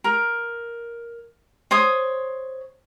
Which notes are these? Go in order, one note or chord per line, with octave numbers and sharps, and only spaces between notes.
A#4
C5 C#5 D#6